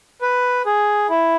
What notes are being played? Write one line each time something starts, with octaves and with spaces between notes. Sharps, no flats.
B4
G#4
E4